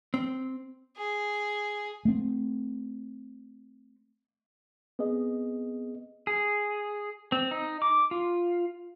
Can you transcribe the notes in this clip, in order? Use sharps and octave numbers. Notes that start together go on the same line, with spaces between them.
C4
G#4
A3 C4
B3 C4 G#4 D#5
G#4
C4
D#4
D6
F4